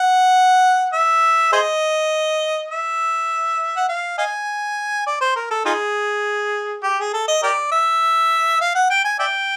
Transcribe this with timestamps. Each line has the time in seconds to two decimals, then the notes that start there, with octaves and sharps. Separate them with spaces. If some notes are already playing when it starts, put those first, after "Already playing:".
Already playing: F#5
0.93 E5
1.53 G#4 C5 D#5
2.70 E5
3.77 F#5
3.89 F5
4.18 D#5 F5 G#5
5.06 D5
5.21 C5
5.36 A#4
5.51 A4
5.65 D#4 F4 G#4
6.83 G4
6.99 G#4
7.13 A4
7.28 D#5
7.43 G4 A#4 D5
7.72 E5
8.61 F5
8.75 F#5
8.90 G5
9.05 G#5
9.19 D5 E5 G5